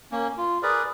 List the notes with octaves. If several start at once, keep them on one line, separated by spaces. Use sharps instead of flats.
A#3 C#4
F4
G#4 A#4 B4 D5